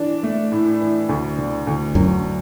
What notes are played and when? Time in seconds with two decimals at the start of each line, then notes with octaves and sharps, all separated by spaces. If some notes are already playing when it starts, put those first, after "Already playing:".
Already playing: E3 D4
0.23 A3
0.52 A2
0.80 E3
1.09 D2
1.38 D3
1.67 D2
1.95 F#2 F#3